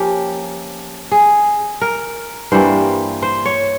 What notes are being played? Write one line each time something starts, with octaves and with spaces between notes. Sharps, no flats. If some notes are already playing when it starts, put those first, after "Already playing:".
Already playing: F3 A#3 C#4 G4
G#4
A#4
G2 E3 G3 A#3 C5
C5
C#5